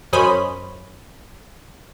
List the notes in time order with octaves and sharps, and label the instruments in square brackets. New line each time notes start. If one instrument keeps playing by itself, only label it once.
[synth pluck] F#2 C#4 C5 D#5 B5